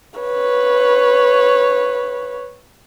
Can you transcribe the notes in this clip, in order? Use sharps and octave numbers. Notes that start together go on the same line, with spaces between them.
B4 C#5